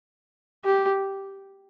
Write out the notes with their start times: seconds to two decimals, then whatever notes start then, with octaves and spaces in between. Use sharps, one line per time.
0.64 G4